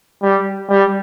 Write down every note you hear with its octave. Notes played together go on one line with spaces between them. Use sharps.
G3
G3